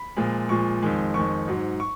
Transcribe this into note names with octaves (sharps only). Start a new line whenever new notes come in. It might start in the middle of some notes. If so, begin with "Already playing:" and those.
Already playing: B5
A#2 F3 G#3
A#2 F3 G#3 C#6
F2 D#3 G#3
F2 D#3 G#3 C#6
G#2 F#3
C#6